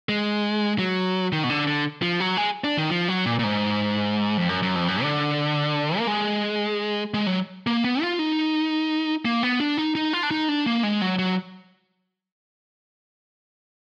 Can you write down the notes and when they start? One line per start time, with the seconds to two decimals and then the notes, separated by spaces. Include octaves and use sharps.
0.09 G#3
0.79 F#3
1.32 D#3
1.44 B2
1.50 D3
1.67 D3
2.02 F3
2.20 F#3
2.37 G#3
2.64 D4
2.77 D#3
2.90 F3
3.08 F#3
3.26 A#2
3.39 A#2
3.44 G#2
4.38 F2
4.49 F#2
4.62 F#2
4.75 F2
4.88 F#2
5.02 D3
5.98 A#3
6.07 G#3
7.14 G#3
7.26 F#3
7.67 A#3
7.84 B3
8.02 F4
8.19 D#4
9.25 A#3
9.43 B3
9.60 D4
9.77 D#4
9.95 D#4
10.13 F4
10.23 D4
10.31 D#4
10.49 D4
10.66 A#3
10.83 G#3
11.02 F#3
11.19 F#3